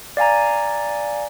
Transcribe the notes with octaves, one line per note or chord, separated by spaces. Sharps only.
D5 F5 G#5 A#5